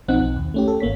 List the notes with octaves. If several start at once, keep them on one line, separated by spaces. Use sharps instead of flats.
B1 F3 C4 D#4 F#5 F#6
B1
D#2
A3 C#4 G4
A4
G#1 A#3 C#5 B6